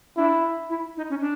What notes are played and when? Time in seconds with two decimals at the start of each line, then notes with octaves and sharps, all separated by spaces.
0.16 D4 E4
0.69 E4
0.97 D#4
1.09 C#4
1.20 D4